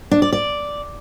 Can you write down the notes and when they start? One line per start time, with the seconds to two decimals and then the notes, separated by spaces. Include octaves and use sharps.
0.11 D4
0.22 D5
0.33 D5